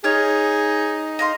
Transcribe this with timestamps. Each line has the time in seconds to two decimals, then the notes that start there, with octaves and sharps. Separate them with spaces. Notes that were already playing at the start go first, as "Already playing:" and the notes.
0.04 D#4 G#4 C#5 F6
1.19 D#5 F5 C6